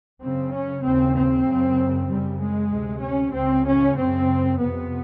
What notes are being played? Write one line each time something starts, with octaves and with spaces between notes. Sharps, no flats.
F#2 C#3 C4
C#4
D#2 C#3 C4
C4
F#2 C#3
F#2 C#3 G3
G#3
D2 C3
C#4
C#2 C#3 C4
C#4
F#2 C#3 C4
F2 C3 B3